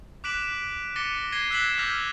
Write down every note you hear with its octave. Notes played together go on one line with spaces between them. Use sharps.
D6 F#6 B6 D7 E7 F#7
D6 A6 A#6 C#7 D#7 G7
G#6 A#6 C7 D#7 G7
E6 F#6 G#6 B6 E7 F#7
D6 F6 G6 A#6 F7